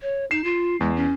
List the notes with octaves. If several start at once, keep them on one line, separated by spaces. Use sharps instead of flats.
C#5
D#4 C7 E7
F4
E2 G#3
C#4